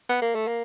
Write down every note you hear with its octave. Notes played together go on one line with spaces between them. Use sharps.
B3
A#3
A3
A#3